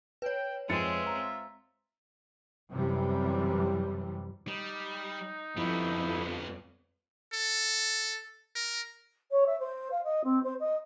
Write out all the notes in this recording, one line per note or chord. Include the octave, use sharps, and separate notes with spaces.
B4 C#5 G5
F2 G#3 C4 F4 E5 A6 C#7
A#5
F#2 C3 E3 G3
G3 D#4
F2 G3 B3 E4
A4
A#4
C#5
E5
C5
F5
D#5
C4
C5
D#5